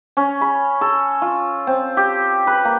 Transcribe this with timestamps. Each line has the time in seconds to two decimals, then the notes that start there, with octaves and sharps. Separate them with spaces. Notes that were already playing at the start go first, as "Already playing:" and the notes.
0.17 C#4
0.41 B5
0.81 A4
1.22 F4
1.67 C4
1.97 G4
2.47 B4
2.65 A#3